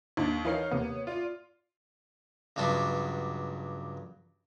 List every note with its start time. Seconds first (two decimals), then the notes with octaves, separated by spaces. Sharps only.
0.17 D#2 D4 D#4
0.45 E3 D#4 A#4 C#5 F5 C7
0.71 D#2 C3 A#3 B3
1.07 F4 D5
2.56 C#2 G2 F#3 B3 D4 C6